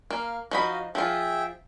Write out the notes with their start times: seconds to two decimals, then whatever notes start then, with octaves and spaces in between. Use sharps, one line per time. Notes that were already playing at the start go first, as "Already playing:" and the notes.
0.10 A#3 F5
0.51 F3 D#4 F#4 D#5 F5 B5
0.95 F3 F4 G#4 E5 G5